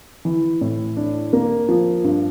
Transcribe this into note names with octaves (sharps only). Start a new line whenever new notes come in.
E3
A2
D4
A#3
F3
G2